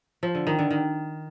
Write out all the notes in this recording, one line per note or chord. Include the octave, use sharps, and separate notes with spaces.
F3
D3
D#3
D3
D#3